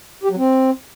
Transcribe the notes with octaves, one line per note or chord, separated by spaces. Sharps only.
G4
F#3
C4